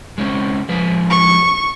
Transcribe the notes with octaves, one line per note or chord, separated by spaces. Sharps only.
G#3 C4 C#4
F3 G#3 B4
C#6